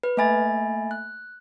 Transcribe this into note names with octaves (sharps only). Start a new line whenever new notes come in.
B4
A3 A#3 E5 G#5 B5 A6
F#6